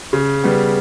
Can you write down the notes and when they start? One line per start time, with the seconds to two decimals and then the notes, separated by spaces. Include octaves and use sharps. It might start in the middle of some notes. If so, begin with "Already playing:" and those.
0.13 C#3
0.44 G3 B3